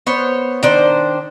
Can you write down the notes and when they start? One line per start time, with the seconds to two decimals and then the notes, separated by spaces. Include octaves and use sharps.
0.07 B3 C5 C#5
0.63 D#3 D4 C5